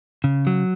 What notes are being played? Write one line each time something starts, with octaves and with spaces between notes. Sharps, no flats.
C#3
F#3